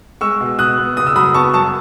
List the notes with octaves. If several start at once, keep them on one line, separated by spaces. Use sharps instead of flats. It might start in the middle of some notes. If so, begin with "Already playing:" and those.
G#3 C#6 E6
B2
B2 D#6 F#6
B3
F#1 D#6
E6
F#3 B5 D#6
B3 A5 C#6
F#2 A5 C#6